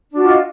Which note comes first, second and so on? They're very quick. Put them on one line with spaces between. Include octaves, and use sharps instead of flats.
D4 F#4 F4 D#5